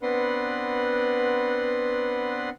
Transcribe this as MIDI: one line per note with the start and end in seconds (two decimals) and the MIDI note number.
0.02 2.50 59
0.02 2.50 60
0.02 2.50 62
0.02 2.50 71
0.02 2.50 78
0.02 2.50 84